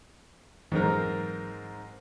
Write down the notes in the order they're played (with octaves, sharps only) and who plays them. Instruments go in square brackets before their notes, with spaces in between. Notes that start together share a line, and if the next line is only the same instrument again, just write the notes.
[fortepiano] G#2 C4 A#4 [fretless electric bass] E3 F#3